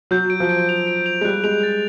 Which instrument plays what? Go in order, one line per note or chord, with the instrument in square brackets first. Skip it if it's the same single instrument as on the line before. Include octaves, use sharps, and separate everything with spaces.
[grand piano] F#3 [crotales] G6
[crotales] D7
[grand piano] F3
[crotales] D7
F7
D7
F7
[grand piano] G#3
[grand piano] G3 [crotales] F#6
[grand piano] G#3 [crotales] F7
[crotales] A6